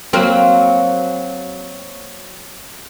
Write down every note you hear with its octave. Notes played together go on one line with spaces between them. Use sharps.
F#3 A#3 C4